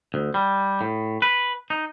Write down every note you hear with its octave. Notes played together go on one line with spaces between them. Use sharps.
D2
G3
A2
B4
D#4